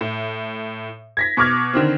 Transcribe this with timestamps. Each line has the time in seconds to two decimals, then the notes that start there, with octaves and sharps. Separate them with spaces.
0.01 A2
1.17 G#6 A#6 B6
1.37 B2 C#6 D6 F6 G#6
1.74 D3 D#3 C4